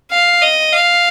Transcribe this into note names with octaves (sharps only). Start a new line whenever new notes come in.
F5
D#5
F5